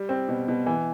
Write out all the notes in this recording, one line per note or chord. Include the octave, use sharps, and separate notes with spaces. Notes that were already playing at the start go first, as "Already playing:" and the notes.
Already playing: G3
C4
B2
B2
E3